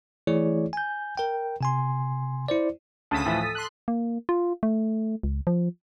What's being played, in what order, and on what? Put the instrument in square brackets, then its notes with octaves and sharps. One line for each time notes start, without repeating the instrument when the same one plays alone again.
[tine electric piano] E3 A3 E4 G#4 C#5 D5
G#5 G6
A#4 G5
C3 G#5 C6
E4 C5 D5
[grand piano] D2 C#3 [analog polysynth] A5 D#6 B6
[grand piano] A2 E3 F3
A4
[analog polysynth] C6 F#6
[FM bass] A#3
F4
A3
C#2
F3